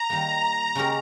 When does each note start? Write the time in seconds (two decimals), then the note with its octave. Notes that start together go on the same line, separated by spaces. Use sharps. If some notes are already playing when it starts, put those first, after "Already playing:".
Already playing: A#5
0.10 D#3 G3 A#3
0.75 C#3 G#3 C#4 G4 A#4